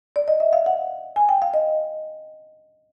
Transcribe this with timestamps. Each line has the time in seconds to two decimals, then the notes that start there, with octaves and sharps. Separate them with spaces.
0.16 D5
0.28 D#5
0.40 E5
0.53 F5
0.66 F#5
1.16 G#5
1.29 G5
1.42 F5
1.54 D#5